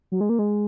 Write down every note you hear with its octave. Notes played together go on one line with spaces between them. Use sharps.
F#3
G#3
A#3
G#3